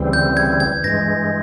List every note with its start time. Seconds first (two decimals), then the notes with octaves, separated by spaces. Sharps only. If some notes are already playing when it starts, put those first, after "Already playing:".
Already playing: D2 C#3 E3 G3 C4
0.13 G6
0.37 G#6
0.60 G#6
0.83 G2 E3 G#3 A#6